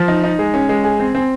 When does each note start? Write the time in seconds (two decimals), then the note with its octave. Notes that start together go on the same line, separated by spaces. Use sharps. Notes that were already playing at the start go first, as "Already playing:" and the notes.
Already playing: F3
0.08 D#4
0.24 D#4
0.39 G#3
0.54 C#4
0.69 G#3
0.84 G#4
0.99 C4
1.15 C4